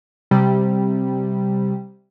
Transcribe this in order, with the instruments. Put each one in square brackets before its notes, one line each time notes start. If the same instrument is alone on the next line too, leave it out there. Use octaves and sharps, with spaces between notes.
[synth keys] C3 G3